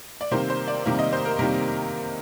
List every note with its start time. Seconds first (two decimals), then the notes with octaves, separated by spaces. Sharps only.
0.21 D5
0.31 C3 D#3 G3 A#3 C5
0.50 C5
0.68 D5
0.85 C3 D#3 G3 A#3
0.99 D#5
1.13 C5
1.25 A#4
1.39 C3 D#3 G3 A#3 A#4